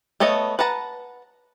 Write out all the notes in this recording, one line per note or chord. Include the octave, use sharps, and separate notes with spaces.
A3 B3 A4 C#5 D#5
B4 F#5 A5 A#5